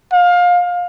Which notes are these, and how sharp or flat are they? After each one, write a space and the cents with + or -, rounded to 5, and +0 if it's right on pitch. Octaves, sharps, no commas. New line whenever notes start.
F5 +25